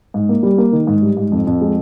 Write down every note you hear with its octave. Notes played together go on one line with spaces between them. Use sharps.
G#2
A#3
G3
A#3
D#3
G#2
G3
G#2
F2
F2
G#3